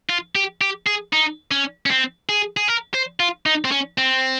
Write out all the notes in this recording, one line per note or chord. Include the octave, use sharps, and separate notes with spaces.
F4
G4
G4
G#4
D#4
C#4
C#4
C4
G#4
G#4
A#4
C5
F4
D#4
C4
C#4
C4